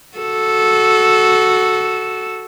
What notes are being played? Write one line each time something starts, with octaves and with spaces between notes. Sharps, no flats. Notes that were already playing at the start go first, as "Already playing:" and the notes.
F#4 A4